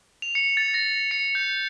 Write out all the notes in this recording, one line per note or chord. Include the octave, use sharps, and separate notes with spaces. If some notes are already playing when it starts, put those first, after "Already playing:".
F7
C#7
A6
A#6
C#7
G6